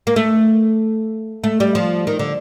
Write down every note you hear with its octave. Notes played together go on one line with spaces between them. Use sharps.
A#3
A3
A3
G3
F3
D#3
D3